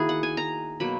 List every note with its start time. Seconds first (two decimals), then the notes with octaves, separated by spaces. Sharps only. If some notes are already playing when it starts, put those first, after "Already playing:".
Already playing: D#3 A#3 E4 F#4 G#4
0.09 F#5
0.23 G#5
0.37 A#5
0.80 B2 F#3 A#3 B5